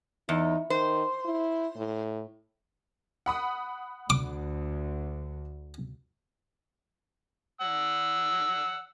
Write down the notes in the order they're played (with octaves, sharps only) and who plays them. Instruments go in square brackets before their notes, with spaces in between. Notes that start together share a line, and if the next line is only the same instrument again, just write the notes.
[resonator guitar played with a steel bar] E2 [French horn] D#4
[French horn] D#3 [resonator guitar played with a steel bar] C5
[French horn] E4
A2
[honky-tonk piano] F#5 B5 D#6
[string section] D2 [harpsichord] D6
[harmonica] F#5 E6